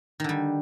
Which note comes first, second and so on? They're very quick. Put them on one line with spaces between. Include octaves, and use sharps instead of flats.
D#3 D3 G3